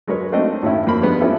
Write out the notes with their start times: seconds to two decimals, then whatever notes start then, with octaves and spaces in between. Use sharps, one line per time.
0.07 F#3 G#3 A#4 B4 C#5
0.32 A3 A#3 C4 D4 D#4 D#5
0.63 A2 D#3 C#4 E4
0.87 F2 A#3 B5
1.02 G3 G#3 B3 D4
1.21 E3 F3 C#4 E4 G4 A4